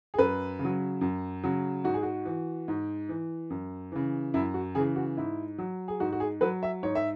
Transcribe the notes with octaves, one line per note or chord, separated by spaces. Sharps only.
G#4
F#2 B4
C#3
F#3
F#2
C#3 F#3
G#2 F#4
G#4
F#4
E3
G#2
E3
F#2
C#3 E3
F#2 E4
F#4
C#3 E3 G#4
F#4
G#2 E4
F#3
G#4
G#2 F#4
F#4
G#4
F#3 B4
E5
G#2 C#5
E5